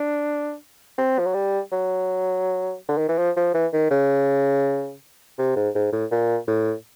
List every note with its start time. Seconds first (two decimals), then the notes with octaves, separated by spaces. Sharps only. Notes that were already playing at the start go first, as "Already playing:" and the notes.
Already playing: D4
0.98 C4
1.19 F3
1.26 F#3
1.34 G3
1.72 F#3
2.89 D3
2.98 D#3
3.09 E3
3.18 F3
3.37 F3
3.54 E3
3.73 D#3
3.91 C#3
5.39 C3
5.57 G#2
5.75 G#2
5.92 A2
6.12 A#2
6.48 A2